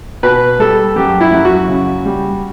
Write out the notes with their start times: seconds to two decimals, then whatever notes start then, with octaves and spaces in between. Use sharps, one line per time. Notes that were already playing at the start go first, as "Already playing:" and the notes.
0.23 B2 B4
0.59 G3 A4
0.96 F#2 G4
1.21 E4
1.32 F#2
1.45 F#4
1.69 C#3
2.06 G3